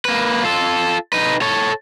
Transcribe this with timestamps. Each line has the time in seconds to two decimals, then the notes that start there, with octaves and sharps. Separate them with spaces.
0.05 A#3 B4
0.43 F4 A4
1.13 D#4 B4
1.42 A4 C#5